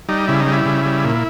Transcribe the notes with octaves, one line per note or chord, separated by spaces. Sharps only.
G3 D#4
C#3 E4
D#4
G3
E4
C#3
G3
A#2